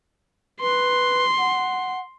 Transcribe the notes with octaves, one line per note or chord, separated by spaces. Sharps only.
B4 C6
F#5